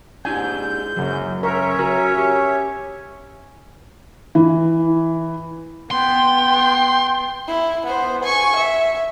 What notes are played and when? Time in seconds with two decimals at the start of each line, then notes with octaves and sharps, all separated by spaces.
0.25 G#2 D4 E4 G4 G#5 G6
0.97 F#2 C#3 F#3
1.43 C#4 A#4 C#5 E5
1.79 F#4 A#4
2.17 G4
4.35 E3
5.91 B3 G5 C6
7.48 E4
7.86 B3 C5
8.24 G#5 C#6
8.57 E5